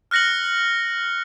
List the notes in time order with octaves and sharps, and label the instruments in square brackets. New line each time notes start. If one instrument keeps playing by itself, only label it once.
[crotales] F6 F#6 A#6 C#7 F#7